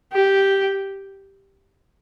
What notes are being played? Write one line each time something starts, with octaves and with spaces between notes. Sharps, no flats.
G4